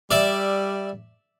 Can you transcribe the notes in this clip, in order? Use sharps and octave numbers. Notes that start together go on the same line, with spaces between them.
G3 D5 E5